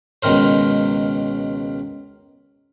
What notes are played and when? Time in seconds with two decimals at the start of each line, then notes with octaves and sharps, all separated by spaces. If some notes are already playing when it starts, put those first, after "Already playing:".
0.23 C#2 B2 D#3 A#4 C5